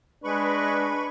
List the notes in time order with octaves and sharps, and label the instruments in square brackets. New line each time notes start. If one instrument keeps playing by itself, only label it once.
[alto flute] G#3 [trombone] D4 [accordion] B4 B5 C#6